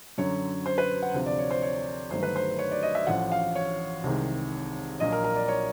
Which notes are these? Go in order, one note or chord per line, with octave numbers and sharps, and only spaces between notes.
F#2 D3 F#3 C#5
C5
B4
F#5
D2 C3 F3
D5
C#5
C5
C#5
G1 G2 D#3 F#3 A3 C5
B4
C5
C#5
D5
D#5
E5
A1 A2 F3 F#5
F5
C#5
C2 C3 D#3 G#3
A#1 A#2 F#3 D#5
A#4
A#4
D5
C#5